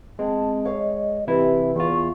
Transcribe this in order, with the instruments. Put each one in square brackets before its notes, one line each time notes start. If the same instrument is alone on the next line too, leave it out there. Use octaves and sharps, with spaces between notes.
[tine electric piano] G#3 [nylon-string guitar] C4 [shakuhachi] A5
[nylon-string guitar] C#5 F5 [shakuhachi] D#5
[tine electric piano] C3 E4 [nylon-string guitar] E3 [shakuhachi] G4
[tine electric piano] E2 F4 [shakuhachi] C#6